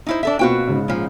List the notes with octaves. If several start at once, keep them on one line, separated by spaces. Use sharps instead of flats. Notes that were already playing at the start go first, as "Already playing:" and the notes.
D#4 E4 C5
D4 A4 E5
B2 A#3 C4 F4 F#4 G5
G#2 C#3
A#2 F3